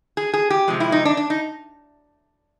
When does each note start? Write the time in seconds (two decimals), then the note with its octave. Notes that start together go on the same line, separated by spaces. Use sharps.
0.17 G#4
0.33 G#4
0.50 G4
0.68 C3 F3 G#3
0.80 E4
0.92 D#4
1.05 D4
1.17 D4
1.30 D#4